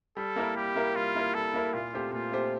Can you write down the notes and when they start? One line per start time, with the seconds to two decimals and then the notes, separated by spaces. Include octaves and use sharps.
0.17 G3 A4
0.36 A#3 E4 A#4
0.56 G3 G4
0.76 A#3 E4 A#4
0.96 G3 F4
1.15 A#3 E4 A#4
1.34 G3 A4
1.53 A#3 E4 A#4
1.74 A#2 F4
1.93 A3 C4 G4 C5
2.12 A#2 F4
2.32 A3 C4 G4 C5